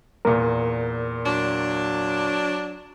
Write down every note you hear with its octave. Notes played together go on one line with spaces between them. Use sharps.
E2 A#2 A#4
F#3 D4